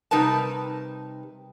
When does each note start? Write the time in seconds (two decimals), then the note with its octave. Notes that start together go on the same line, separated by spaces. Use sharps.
0.11 C3 G3 D#4 A#4 B4 A5